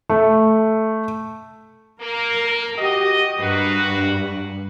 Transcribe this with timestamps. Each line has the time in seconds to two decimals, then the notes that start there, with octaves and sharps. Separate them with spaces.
0.10 A3
2.00 A#3 A#4
2.78 F#4 G4 D#5
3.39 G2 A#3 F#4 B4